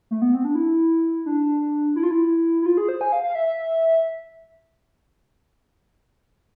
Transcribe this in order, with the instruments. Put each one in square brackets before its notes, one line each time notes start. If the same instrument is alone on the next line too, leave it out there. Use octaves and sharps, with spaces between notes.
[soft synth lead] A3
B3
C4
D4
E4
D4
E4
F4
E4
E4
F4
G#4
C5
G#5
F5
F5
E5